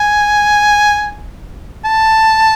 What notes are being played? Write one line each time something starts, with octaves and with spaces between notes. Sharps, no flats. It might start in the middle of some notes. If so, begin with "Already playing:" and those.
Already playing: G#5
A5